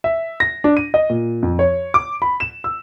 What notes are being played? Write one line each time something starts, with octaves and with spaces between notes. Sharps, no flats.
E5
A#6
D4
D#7
D#5
A#2
F2
C#5
D6
B5
E7
E6